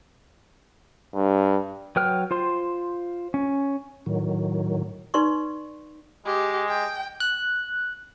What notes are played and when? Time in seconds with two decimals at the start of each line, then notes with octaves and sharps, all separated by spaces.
1.14 G2
1.96 F#3 B4 G5 F6
2.31 F4 C5 C6
3.34 C#4
4.06 A2 D#3 F#3
5.14 D#4 B4 D5 C6 C#6
6.26 G#3 G4
6.69 G5
7.20 F#6